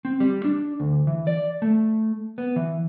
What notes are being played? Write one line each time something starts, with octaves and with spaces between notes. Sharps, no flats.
C4
G3
D4
D2
E3
D5
A3
B3
E3